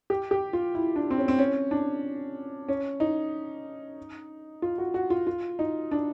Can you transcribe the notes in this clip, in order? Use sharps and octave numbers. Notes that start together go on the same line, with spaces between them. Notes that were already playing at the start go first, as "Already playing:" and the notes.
G4
G4
F4
E4
D4
C4
C#4
C4
C#4
D4
C#4
D#4
F4
F#4
F#4
F4
F4
D#4
D4